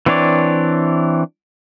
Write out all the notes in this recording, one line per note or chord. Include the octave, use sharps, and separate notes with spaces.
E3 C4 D4 C#5 D5